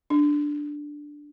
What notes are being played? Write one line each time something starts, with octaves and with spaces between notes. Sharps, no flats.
D4